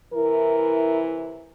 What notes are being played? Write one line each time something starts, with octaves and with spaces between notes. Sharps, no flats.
C3 E3 E4 A#4